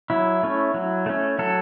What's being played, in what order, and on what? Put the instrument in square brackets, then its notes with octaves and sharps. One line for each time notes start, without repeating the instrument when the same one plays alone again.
[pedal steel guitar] F#3 E4
A3 C#4
F#3
A3 C#4
F#3 A4